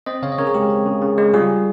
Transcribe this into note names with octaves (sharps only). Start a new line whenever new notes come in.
C4 C5 D#5
C#3 C#5 F5
D#5
C#3 A#4 C#5
G#4
G#3 G4
C4
C#3
C#3
G#3
G3 F4 G#4